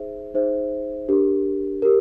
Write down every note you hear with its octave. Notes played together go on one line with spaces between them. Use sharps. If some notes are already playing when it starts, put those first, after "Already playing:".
Already playing: D#4 G#4 C5 E5
D#4 G#4 C5 E5
D4 G4 A#4
G4 A#4